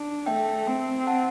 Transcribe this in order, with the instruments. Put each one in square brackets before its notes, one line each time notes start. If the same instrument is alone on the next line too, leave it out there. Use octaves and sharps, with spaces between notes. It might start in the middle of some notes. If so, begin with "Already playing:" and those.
Already playing: [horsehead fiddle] D4
[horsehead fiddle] A3 [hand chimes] E5 G5
[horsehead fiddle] C4
[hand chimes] F#5 A5